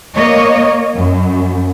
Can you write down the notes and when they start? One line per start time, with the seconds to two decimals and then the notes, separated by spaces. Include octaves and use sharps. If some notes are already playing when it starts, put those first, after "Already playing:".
0.16 A#3 C#5 D#5
0.95 F#2